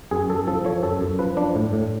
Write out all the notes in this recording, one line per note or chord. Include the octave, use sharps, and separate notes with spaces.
F#2 G#4
F#2 A4
F3 A4
F3 C#5
F#2 A4
F#2
F3 B4
F3 D4
A2
A2